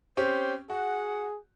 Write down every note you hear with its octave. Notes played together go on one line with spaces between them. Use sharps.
C4 C#4 G4 C5
F#4 G#4 F#5